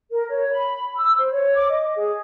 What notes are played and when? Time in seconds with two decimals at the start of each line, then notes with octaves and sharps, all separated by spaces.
0.10 A#4
0.28 C#5
0.51 B5
0.96 E6
1.15 C5
1.31 C#5
1.54 D6
1.69 D#5
1.96 G#4